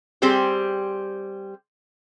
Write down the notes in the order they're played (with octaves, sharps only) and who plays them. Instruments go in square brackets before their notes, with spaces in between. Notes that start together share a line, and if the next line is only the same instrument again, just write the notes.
[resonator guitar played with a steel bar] G3 C4 G4 G#4 C5